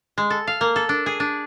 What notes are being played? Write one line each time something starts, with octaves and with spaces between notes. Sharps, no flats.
G#3
A4
F5
A#3
A4
D4
G#4
D4